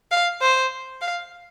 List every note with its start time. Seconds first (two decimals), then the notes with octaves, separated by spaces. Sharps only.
0.11 F5
0.42 C5
1.01 F5